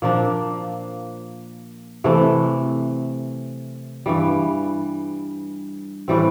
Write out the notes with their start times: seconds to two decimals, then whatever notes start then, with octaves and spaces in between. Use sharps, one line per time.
0.02 A#2 F3 A#3 D4
2.04 C3 E3 A3
4.06 G2 E3 G3
6.08 A2 E3 G3 C4